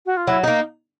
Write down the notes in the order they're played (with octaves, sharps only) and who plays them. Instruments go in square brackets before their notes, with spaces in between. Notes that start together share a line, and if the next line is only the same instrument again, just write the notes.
[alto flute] F#4
F4
[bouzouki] F#3 [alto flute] E4
[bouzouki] A#3 D#4